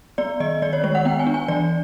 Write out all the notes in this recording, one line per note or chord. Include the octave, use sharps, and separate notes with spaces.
B3 D5
D#3 D#5
D#3 D5
C#5
G#3 C#5
F#5
B3 G5
G#5
D4
G#5
E3 D5